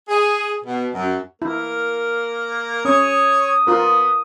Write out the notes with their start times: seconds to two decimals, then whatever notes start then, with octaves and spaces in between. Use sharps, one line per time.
0.08 G#4
0.64 B2
0.94 F#2
1.42 A#3 E4 A#4
2.85 C#4 C#5 C#6 D#6
3.67 B3 F4 A#4